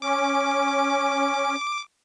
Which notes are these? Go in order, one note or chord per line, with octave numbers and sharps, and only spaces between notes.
C#4 D6